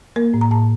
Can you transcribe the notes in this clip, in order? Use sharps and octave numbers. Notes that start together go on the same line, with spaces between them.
A#3 A#4
A2
A#5
A2 A5